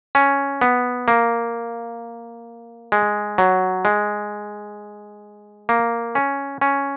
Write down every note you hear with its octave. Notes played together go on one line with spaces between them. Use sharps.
C#4
B3
A#3
G#3
F#3
G#3
A#3
C#4
C#4